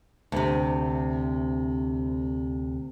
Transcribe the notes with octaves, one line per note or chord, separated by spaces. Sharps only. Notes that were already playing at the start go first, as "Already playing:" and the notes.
D2 C3